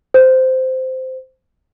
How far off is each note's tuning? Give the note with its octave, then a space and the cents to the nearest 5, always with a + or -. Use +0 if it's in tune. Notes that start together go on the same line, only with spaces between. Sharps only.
C5 -10